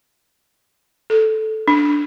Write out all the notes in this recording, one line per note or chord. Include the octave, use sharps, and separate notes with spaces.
A4
D4